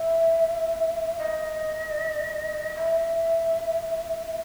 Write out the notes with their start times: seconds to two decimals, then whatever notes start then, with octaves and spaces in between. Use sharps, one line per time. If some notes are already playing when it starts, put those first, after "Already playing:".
Already playing: E5
1.18 D#5
2.75 E5